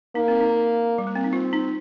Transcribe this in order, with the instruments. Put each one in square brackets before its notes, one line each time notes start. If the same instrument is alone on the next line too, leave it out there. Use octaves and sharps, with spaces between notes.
[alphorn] A#3 [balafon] D#4
[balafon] C4
D#4
G3
A#3
C4
D#4
[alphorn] C4 [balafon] F4
[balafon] D#4